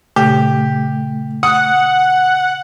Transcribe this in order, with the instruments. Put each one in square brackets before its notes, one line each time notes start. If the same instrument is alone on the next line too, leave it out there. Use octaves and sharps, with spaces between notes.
[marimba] A#2 C#3 [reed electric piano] A3 [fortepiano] G4
[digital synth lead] F#5 [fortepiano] D#6